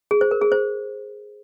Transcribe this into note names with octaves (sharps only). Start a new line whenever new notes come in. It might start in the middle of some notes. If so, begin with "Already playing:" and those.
G#4
C5
A#4
G#4
C5